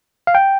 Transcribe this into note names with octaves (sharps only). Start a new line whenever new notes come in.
F5
G5